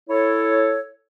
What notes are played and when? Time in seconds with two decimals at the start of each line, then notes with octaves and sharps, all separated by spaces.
0.09 E4 A4 C#5